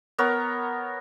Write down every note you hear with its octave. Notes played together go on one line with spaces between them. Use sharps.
B3 A#4 C#5